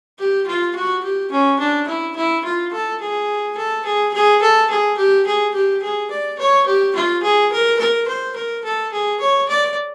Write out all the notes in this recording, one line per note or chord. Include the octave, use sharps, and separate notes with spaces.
G4
F4
F#4
G4
C#4
D4
E4
E4
F4
A4
G#4
A4
G#4
G#4
A4
G#4
G4
G#4
G4
G#4
D5
C#5
G4
F4
G#4
A#4
A#4
C5
A#4
A4
G#4
C#5
D5